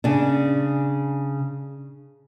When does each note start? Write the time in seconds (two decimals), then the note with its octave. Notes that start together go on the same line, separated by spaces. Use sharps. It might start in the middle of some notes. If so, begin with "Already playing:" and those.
0.04 C#3 D4